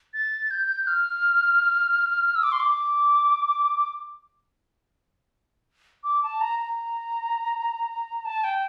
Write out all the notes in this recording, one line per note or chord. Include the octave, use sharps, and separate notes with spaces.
A6
G6
F6
E6
D6
C6
D6
D6
A5
A#5
A#5
A5
G5